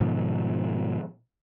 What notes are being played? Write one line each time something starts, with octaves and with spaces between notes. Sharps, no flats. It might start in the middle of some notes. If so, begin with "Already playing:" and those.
G#2 B2 D#3 F3